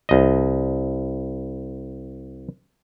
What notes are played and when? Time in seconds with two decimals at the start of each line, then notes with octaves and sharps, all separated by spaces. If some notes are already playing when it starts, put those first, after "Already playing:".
0.09 C2 D#5